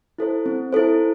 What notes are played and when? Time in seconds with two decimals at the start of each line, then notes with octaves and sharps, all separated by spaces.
0.18 E4 A4 C5
0.46 C4
0.73 E4 A4 C5